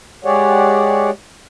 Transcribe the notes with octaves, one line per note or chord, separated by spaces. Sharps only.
G#3 G4 G#4 C#5 D5 F#5